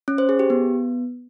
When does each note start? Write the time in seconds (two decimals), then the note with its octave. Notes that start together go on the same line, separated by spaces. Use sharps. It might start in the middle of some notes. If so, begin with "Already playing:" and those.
0.08 C#4
0.18 C5
0.29 G#4
0.39 G4
0.50 B3